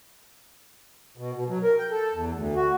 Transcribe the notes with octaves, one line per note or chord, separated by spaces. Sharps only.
B2
B2
F#3
A#4
G5
A4
E2
D2
F#4